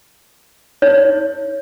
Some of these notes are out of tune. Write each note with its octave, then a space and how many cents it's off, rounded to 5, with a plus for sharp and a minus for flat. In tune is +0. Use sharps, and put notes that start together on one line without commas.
D#4 +40 C#5 +0